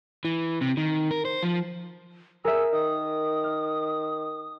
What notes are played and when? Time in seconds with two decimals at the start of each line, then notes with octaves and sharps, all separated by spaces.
0.25 E3
0.61 C3
0.77 D#3
1.11 A#4
1.25 C5
1.43 F3
2.45 G#4 A#4 E5 E6
2.73 D#3 D#6
3.44 F6